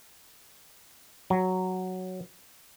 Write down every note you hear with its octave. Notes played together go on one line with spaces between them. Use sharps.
F#3